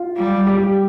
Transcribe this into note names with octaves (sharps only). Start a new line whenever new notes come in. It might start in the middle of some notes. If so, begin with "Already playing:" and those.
Already playing: F4
G3
G4